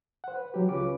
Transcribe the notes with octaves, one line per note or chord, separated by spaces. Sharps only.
C5 F#5
B4
F#3 G4
C#2 C#3 C#4 F4 B4 D6